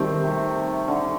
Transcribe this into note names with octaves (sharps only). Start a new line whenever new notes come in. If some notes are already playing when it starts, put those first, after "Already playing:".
Already playing: D#3 G3 A3 C4
C3
D3